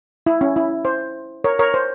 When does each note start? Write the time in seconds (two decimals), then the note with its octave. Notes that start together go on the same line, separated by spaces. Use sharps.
0.26 E4
0.41 C#4
0.56 E4
0.85 C5
1.44 A#4 C#5
1.59 A#4 C#5
1.74 C5